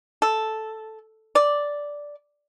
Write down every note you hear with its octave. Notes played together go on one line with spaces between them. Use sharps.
A4
D5